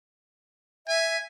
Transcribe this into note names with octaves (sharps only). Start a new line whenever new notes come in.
E5 G#5